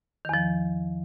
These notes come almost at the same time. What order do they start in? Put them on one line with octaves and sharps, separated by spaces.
D#3 E2 F3